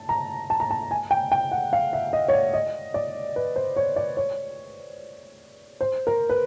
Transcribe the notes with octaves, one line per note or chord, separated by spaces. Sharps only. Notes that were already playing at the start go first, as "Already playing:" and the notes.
Already playing: A5
A#5
A5
A#5
A5
G#5
G5
G5
F#5
F5
E5
D#5
C#5
D5
D#5
D5
B4
C5
C#5
D5
C#5
C5
A#4
B4